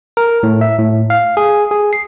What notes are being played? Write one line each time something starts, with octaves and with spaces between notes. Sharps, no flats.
A#4
A2
E5
A2
F5
G#4
G#4
C7